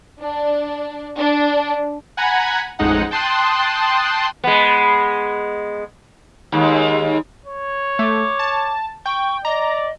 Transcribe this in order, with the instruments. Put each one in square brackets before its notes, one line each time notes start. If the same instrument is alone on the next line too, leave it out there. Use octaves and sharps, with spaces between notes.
[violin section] D4
D4
[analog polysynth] F#5 G#5 A#5 B5 G#6
A1 F2 G#3 D#4 F#5
G5 A5 C6 D#6 F#6
[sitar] G#3 B3
D#2 G#3
[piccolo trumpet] C#5
[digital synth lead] A3 [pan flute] D6
[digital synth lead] A5
[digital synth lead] G5 [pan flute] C#6
[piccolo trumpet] D5 [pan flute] D#5 [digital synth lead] A#5